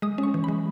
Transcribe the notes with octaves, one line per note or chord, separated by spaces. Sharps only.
G#3 D#6
C#4
C#6
E3
G#3 B5